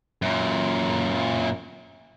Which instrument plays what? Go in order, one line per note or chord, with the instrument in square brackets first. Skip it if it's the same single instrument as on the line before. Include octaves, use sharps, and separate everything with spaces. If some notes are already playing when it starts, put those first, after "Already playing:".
[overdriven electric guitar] F#2 A#2